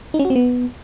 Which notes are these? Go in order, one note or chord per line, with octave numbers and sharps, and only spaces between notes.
D#4
C#4
F#4
C4
B3